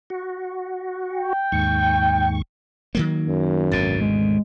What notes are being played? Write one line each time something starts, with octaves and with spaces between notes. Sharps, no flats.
F#4
G5
D#2 G#2 C#6
D#3 F#3 A#3
F#2
G#1 D2 B2 A6
G#3